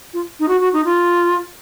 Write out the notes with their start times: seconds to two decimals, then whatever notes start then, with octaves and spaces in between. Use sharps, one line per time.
0.13 F4
0.40 D#4
0.48 F#4
0.61 F#4
0.73 D#4
0.85 F4